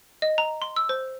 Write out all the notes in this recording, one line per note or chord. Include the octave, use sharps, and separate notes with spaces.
D#5
A#5
C6
E6
C5